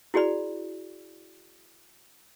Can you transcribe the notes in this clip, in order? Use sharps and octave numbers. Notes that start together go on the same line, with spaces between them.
E4 F#4 G#4 D5 B5